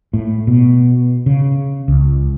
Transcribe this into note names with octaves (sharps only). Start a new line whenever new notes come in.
A2
B2
C#3
C#2